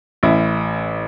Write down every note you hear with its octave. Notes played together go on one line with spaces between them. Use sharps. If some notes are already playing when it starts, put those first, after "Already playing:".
A1 E4